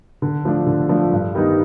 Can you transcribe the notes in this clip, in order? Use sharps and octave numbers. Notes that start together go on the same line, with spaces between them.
D3
F3 A3 D4
D3
F3 A3 D4
G2
D#3 G3 B3 D#4